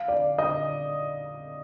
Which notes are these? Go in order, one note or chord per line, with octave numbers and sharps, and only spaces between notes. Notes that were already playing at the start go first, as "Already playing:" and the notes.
Already playing: F5
D5
D#5